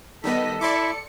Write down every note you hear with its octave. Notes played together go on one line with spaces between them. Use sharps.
D#3 G3 B3 A4 D#5 B6
E4 D5 E5 C6 D6 C#7